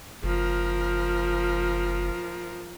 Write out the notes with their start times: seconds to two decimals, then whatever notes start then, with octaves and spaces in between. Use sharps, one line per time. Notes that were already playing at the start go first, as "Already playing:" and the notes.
0.23 F#1 F3 A#4